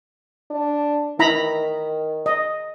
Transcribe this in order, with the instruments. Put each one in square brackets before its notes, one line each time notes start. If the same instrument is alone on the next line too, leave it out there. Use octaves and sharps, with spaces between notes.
[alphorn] D4
[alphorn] D#3 [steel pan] E4 A#5 B5
[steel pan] D#5